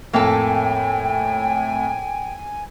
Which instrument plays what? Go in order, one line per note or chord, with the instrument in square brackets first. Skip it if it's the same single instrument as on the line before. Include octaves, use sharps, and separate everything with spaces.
[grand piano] F2 A2 [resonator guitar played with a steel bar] A#3 A4 [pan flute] G5 [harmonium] G#5